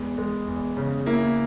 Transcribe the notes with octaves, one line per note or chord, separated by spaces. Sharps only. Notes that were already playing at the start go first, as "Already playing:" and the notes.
Already playing: E2 G#3
G#3
E2
C#3
A#3 E4